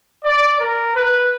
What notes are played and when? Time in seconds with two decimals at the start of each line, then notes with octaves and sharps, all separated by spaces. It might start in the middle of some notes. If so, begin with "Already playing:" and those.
0.25 D5
0.60 A#4
0.95 B4